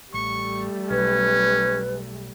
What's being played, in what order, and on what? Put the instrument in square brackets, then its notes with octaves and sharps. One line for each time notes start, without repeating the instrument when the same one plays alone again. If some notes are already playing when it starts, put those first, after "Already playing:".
[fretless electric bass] A1 [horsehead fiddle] G3 A3 [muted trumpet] C#6
[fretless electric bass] B1 [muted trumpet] C#4 [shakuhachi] B4